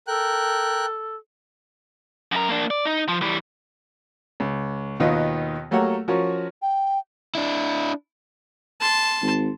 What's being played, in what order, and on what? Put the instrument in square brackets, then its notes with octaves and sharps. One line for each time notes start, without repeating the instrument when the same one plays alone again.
[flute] A4 [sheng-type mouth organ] A#4 G5 F#6
[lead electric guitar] F#2 A#4
A#3 D4
D5
D#4
F3
E3 G3
[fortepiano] C#2
D#2 B2 D#3 B3 F4
F#3 A3 A#3 G4 C#5 F#5
F3 C#4 F#4 A#4 C#5
[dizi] G5
[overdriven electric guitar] D4 E4
[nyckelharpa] A5 C6
[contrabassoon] G#1